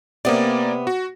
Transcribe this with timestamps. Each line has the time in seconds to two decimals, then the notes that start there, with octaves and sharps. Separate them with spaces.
0.25 C3 A#3 B3 D5
0.87 F#4